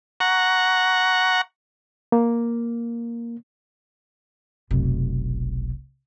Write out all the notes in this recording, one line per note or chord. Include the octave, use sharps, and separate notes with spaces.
F#5 A#5 C#6
A#3
F1 B1